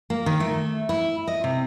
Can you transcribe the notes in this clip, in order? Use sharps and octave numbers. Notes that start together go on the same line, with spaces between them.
A#3
D#3
A3
E4
D#5
C3